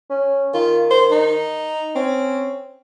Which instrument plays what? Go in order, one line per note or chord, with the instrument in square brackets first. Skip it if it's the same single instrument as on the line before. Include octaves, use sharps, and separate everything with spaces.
[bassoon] C#4
[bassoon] D#3 [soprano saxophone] F4
[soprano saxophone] C5
D#4
[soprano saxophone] C4 [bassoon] C#4